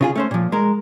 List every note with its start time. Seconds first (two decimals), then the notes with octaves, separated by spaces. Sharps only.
0.01 C#3 F4 G#4
0.16 A3 C#4 C5
0.31 A#2 F3
0.52 G#3 A#4